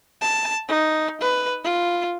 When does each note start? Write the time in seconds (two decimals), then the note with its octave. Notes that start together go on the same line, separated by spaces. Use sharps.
0.22 A5
0.68 D#4
1.21 B4
1.64 F4